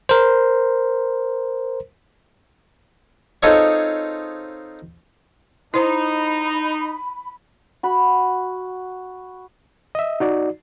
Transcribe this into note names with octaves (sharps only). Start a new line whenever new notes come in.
A#4 C5
C4 D#4 F4 G#4 A4 C#5
D#4 E4 C5 B5
F#4 B5
D#5 E5
D#4 F#4 D5